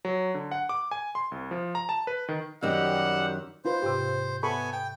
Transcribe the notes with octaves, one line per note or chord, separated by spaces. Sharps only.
F#3
D3
F#5
D6
G#5
C6
C2
F3
A#5
A5
B4
D#3
F#2 D#3 G3 G4 F#5 E6
D#4 F4 B4 C5
G#2 C3 G4
B3 A4 G#5 B5 C#6
G5